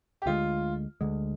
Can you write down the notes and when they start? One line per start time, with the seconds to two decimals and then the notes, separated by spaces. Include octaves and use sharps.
0.22 G4
0.26 D2 D3 G#3 F4
1.01 D2 D3 G#3